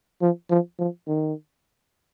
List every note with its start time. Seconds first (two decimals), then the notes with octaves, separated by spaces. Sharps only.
0.21 F3
0.50 F3
0.79 F3
1.07 D#3